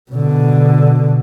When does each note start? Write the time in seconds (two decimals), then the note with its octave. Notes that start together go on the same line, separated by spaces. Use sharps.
0.12 B2 D3